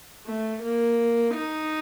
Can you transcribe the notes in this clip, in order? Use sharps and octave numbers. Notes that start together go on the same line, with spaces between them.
A3
A#3
D#4